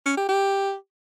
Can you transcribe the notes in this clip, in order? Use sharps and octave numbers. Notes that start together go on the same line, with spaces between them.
C#4
G4
G4